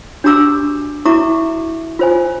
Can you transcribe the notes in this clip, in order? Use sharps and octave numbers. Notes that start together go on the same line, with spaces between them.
D4 F#4 G4 A#5 D6 E6
E4 F#4 E5 A#5 C#6 D6
F4 C5 G#5